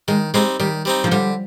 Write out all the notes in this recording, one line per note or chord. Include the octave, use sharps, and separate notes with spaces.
D#3 G#3
G3 G#3 C4 D#4
D#3 G3
G3 C4 D#4
F3
D3 G3